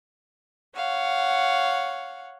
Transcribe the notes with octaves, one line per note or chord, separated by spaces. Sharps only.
C#5 F5 F#5